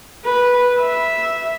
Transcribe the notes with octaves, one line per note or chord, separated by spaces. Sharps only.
B4
E5